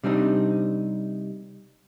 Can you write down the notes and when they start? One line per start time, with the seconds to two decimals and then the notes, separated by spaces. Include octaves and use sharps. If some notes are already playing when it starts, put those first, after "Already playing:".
0.04 C3 G3 C4 D4 D#4